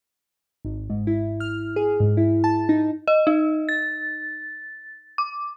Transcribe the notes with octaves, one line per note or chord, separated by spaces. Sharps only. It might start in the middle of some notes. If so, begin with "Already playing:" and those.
G#1
G#2
E4
F6
G#4
G#2
E4
A5
D#4
D#5
D#4
A6
D6